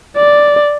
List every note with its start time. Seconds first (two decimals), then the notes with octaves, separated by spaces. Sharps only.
0.17 D5